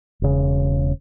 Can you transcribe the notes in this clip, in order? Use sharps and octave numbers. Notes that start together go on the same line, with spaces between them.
E1 C#3